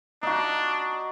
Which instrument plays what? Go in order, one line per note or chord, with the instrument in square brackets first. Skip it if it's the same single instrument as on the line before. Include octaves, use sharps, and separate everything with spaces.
[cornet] D4 [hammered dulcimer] D#4 F#4